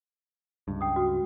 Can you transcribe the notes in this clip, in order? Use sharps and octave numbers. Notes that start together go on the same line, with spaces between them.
C#2 G2
G5 D#6
F#4